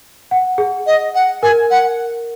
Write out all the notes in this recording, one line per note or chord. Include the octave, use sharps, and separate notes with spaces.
F#5
G#4
D#5
F#5
A#4 G#5
F#5